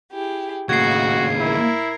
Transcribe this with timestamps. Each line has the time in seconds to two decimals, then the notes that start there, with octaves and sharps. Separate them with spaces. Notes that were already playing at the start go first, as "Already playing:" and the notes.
0.12 E4 G4 G#4
0.69 D#2 A2 C#3 F#4 G#6 C7
1.40 E4 A#4